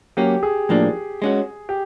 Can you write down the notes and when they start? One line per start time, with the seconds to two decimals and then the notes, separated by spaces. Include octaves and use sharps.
0.17 F#3 A#3 C#4 G4
0.43 G#4
0.69 A2 F3 A#3 D4
1.22 G#3 C#4 F#4
1.69 G4